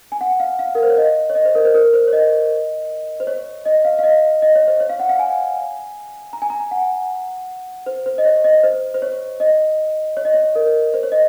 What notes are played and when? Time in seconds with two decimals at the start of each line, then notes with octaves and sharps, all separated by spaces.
0.12 G#5
0.21 F#5
0.40 F5
0.59 F5
0.75 A#4
0.83 C5
0.90 C#5
0.98 D#5
1.29 C#5
1.35 D#5
1.45 C5
1.55 A#4
1.65 C5
1.75 A#4
1.93 C5
2.07 C#5
2.13 D#5
3.20 C5
3.27 C#5
3.65 D#5
3.85 F5
3.99 F5
4.03 D#5
4.42 D#5
4.56 C#5
4.67 C5
4.80 C#5
4.89 F5
5.00 F#5
5.09 F5
5.19 G#5
6.33 A#5
6.42 G#5
6.50 A#5
6.71 F#5
7.86 C5
8.06 C5
8.18 D#5
8.25 C#5
8.44 D#5
8.63 C5
8.94 C5
9.02 C#5
9.40 D#5
10.17 C#5
10.25 D#5
10.34 C#5
10.55 A#4
10.94 C5
11.03 C#5
11.12 D#5